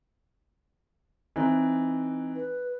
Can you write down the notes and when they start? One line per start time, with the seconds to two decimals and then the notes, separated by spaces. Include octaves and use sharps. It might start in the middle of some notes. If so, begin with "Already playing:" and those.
1.36 E3 C4 D#4
2.35 B4